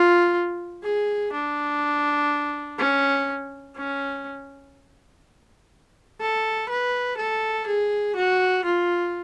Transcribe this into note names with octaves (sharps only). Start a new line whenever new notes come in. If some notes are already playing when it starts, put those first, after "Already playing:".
Already playing: F4
G#4
D4
C#4
C#4
A4
B4
A4
G#4
F#4
F4